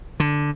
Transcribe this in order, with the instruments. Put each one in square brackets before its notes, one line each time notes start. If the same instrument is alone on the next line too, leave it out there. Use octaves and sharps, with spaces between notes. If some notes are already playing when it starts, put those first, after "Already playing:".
[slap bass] D3